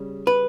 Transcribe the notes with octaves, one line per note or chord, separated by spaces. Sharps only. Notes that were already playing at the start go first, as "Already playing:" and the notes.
Already playing: C#3 G3
B4